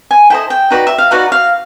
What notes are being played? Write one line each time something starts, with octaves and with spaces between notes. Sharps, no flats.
G#5
E4 A4 C5 D#5 G5
G5
D#4 F#4 B4 D5
E5
F5
D#4 F#4 B4 D5 F#5
F5